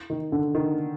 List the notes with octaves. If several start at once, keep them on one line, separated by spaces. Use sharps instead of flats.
D#3
D3
D#3